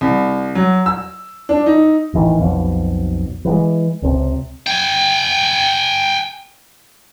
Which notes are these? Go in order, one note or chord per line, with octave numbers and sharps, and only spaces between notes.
C2
F#3
E6
D4
D#4
A1 D#3 E3
B1 F2 B2
E3 F#3 G#3
C#2 C3
G5 G#5